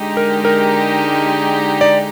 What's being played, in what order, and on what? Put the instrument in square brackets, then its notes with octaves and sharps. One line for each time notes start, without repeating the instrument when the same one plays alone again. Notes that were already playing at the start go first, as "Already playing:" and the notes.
Already playing: [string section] D3 G#3 D#4 G4
[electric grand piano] A#4
A#4
D5